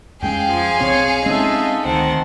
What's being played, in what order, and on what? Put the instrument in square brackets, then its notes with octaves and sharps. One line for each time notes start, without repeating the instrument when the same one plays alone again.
[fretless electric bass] F2 G#3 C#4 [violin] G#4 F5 [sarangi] G5
[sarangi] F3 [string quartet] G#5 C6
[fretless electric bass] B1 B2 C4 [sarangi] C#5
[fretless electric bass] G#3 C4 C#4 [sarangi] D#4 [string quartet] F4 A4 E5
[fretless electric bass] D2 [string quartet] D#3 F#5 A5 [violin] C4